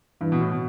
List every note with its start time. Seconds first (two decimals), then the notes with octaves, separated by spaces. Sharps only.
0.21 G2 E3
0.32 B2
0.41 A2
0.51 B2